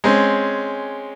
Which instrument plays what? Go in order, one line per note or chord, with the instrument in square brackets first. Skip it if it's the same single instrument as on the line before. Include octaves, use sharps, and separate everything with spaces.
[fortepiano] G#3 C4 C#4